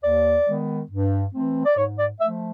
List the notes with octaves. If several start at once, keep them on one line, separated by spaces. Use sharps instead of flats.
D#2 D5
D#3 G#3 B3
G2
E3 A3 C4
D5
G#2 C#5
D5
F3 A3 E5